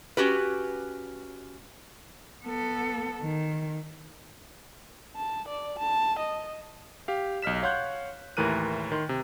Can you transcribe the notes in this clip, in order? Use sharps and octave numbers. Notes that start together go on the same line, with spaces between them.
C#4 F#4 G4 B4
B3 A4
D#3
A5
D5
A5
D#5
G4 F5
B1 D#5 F6 B6 E7
C#5 F5 F#5 C6 F#6 G6
D#2 A2 E3 A#4 F#6 D#7
D#3 C6
C3